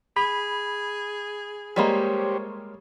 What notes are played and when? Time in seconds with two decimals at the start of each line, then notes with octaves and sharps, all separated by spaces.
0.17 G#4 B5
1.76 G3 G#3 A#3 G4 C5 C#5